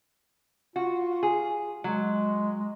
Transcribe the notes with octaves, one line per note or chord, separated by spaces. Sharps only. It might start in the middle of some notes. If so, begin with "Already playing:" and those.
F4 F#4
G#4
F#3 G#3